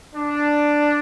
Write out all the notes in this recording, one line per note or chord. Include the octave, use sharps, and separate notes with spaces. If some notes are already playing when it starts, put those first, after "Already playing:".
D4